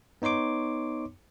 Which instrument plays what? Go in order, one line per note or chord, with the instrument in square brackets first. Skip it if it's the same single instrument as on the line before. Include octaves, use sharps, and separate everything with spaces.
[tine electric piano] B3 D#4 C#5 C6 D6